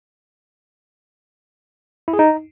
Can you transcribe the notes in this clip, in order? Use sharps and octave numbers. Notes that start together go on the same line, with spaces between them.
E4
G#4
D#4